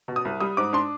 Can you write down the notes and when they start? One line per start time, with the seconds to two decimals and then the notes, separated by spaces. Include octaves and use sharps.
0.08 B2
0.16 D#6
0.25 C2
0.40 G3 D#6
0.57 G#2 D6
0.73 D4 C6